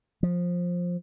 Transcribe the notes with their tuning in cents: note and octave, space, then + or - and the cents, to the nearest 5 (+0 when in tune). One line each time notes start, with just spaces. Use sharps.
F3 +15